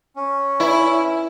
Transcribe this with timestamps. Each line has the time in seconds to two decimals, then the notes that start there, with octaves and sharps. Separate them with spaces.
0.16 C#4
0.60 E4 B4 D5 B5